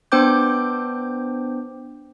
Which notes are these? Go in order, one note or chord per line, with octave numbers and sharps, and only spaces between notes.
B3 D4 C5 G5 D6 G6